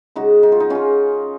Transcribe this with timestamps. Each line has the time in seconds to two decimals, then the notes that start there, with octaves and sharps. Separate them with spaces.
0.16 C#3 G#3 D#4 F#4
0.43 D#4
0.52 F4
0.60 D#4
0.70 C#3 G#3 C#4 F4